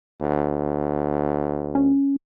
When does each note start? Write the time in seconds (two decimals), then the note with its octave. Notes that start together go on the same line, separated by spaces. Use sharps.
0.21 D2
1.75 C#4